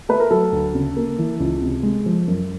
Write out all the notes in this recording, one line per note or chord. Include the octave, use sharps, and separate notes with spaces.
A3 B4
A#4
F#3 A4
D2
C#3
A#3
E3
C#2
C3
G#3
F3
F#2